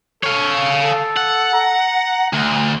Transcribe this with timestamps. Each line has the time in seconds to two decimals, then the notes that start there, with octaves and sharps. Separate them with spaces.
0.23 A4 C#5 F5
0.83 A4
1.17 F#5
1.54 A#5
2.33 D2